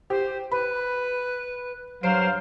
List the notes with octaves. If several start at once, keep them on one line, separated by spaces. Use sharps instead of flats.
G4 C5
B4 B5
G2 F#3 C5 F5 D7